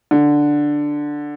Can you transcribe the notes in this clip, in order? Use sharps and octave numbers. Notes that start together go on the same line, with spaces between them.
D3